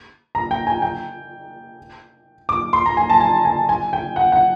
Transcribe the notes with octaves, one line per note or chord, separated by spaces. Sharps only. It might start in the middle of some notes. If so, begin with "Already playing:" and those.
A#5
G5
G#5
G5
D6
C6
A#5
G#5
A5
G#5
G#5
G#5
G5
F#5
F#5